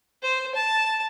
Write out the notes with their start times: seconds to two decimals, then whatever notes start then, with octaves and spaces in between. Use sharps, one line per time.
0.23 C5
0.55 A5